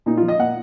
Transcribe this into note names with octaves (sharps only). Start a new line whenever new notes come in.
A#2 D#4
F4
F3
D#5
A#2 F#5